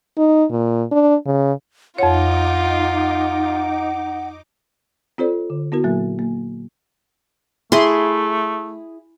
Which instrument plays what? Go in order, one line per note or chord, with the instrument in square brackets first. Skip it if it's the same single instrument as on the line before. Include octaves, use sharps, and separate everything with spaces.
[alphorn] D#4
A#2
D4
C#3
[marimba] F2 C#5 [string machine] D#4 D6 [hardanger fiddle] F4 [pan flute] F#5
[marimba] C4 F4 A4 C5 D5
D3
B3 E4 F#4 A#4
A#2 F#3 A#3
A#3
[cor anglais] A3 [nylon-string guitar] E4 [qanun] G#4 C6